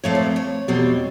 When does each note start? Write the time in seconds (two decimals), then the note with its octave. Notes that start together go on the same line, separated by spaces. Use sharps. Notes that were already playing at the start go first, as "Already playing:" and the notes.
0.04 A#2 F3 A3 C4 C#5
0.15 B4
0.36 C#5
0.68 E2 B2 G3 C4